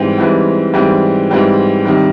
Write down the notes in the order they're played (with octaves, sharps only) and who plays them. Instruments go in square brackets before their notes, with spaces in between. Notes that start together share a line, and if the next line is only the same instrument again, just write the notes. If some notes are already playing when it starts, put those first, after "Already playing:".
Already playing: [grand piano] G#2 E3 G3 C4
G#2 E3 G3 C4
G#2 E3 G3 C4
G#2 E3 G3 C4
C3 D#3 G3